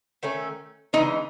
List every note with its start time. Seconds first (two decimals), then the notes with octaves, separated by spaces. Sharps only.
0.23 D#3 A3 C#4
0.93 C#3 E3 G#3 D#4